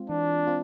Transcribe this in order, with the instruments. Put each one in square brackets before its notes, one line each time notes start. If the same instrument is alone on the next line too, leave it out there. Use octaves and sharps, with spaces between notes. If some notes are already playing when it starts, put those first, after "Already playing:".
Already playing: [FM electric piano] G#3 C4 F4
[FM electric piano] E3 [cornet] D4
[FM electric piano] C4 F4